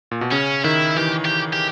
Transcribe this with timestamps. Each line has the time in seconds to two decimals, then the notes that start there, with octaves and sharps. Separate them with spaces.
0.11 A#2
0.21 B2
0.32 C#3 C#4
0.64 D#3 E4
0.96 E3 G4
1.25 G4
1.53 G4